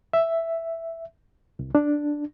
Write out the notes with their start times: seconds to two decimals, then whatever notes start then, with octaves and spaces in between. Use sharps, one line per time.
0.13 E5
1.59 C2
1.75 D4